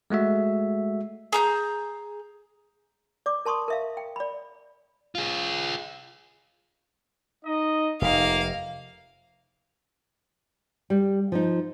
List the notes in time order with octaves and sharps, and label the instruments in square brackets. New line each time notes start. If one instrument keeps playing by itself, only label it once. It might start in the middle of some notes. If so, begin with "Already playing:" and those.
[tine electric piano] G#3 A3 F#4 E5
[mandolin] G#4 A#5 G6
[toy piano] D5 D6
A#4 A5 C6 C#6 D#6
A#4 E5 F5
G5
D5 B5
[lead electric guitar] F4 G#4
[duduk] D#4 [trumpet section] D#5
[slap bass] F1 [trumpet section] A#3 [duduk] D#4 [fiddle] F5
[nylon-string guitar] G3
F3 D#4